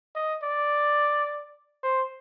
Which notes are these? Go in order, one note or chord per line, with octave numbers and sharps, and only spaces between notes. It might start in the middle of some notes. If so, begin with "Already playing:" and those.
D#5
D5
C5